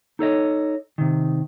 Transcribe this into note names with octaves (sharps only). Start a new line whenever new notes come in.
D#4 A4 C#5 D#5
C3 D#3